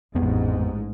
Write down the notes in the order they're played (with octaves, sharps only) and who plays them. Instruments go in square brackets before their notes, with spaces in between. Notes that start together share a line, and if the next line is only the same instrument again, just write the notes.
[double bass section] A1 G#2 [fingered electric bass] F2 B3